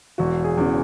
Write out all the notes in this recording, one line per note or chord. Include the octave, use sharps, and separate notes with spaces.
E1 F#4
G#4
E2 C#3